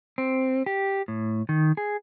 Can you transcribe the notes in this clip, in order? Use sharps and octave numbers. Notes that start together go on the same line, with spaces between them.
C4
G4
A2
D#3
G#4